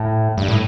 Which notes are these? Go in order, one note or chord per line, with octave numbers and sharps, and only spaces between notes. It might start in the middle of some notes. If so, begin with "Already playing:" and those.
Already playing: A2
G2
A2